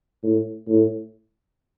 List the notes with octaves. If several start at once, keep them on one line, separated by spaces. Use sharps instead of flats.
A2
A2